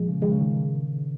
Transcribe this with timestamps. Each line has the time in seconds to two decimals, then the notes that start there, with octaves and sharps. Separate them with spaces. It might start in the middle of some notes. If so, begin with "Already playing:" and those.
Already playing: F2 A#2 F3 G#3
0.08 C#3
0.22 F2 D#3 F3 G#3
0.31 C#3
0.40 D#3